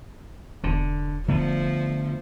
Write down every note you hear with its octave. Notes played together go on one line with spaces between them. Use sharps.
E1 D3
D3 F3 A3 B3